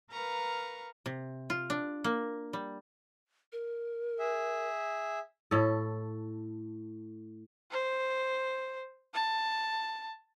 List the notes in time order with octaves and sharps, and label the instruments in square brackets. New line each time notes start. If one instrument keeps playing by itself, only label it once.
[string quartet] A#4 B4 F5 A#5 C#6
[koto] C3
F4
D4
A#3
G3
[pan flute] A#4
[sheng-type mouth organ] G#4 E5
[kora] A2 A4
[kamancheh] C5
A5